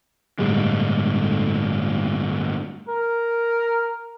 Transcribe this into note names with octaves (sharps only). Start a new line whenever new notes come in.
G1 A2 G3 G#3
A#4